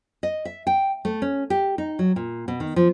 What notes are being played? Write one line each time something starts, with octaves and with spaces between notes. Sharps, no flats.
D#5
E5
G5
A3
C#4
G4
D#4
F#3
A#2
B2
D#3
F3